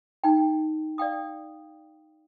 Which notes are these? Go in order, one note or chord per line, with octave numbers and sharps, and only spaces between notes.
D#4 G5
D5 F5 G5 D#6